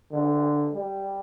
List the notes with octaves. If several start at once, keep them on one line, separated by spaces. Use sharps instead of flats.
D3
G3